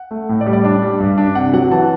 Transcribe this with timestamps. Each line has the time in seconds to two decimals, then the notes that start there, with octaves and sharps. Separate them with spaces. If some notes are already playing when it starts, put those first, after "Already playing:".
Already playing: F#5
0.11 A3
0.29 A2
0.41 D5
0.46 G3
0.53 D5
0.64 D4 D5
0.82 G3
1.00 G2
1.18 D4
1.35 C3 F#5
1.53 F#3 F#5
1.71 E3 A5